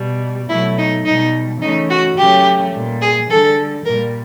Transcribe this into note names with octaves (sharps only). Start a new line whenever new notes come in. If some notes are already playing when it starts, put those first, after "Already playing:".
Already playing: B2 G3
B2 F#3 A3 E4
D#4
B2 G3 D#4
C#3 E3 A3 D#4
F#4
C#3 F#3 A3 G4
A#2 G3
G#4
D3 G3 A4
A#2 G3 A#4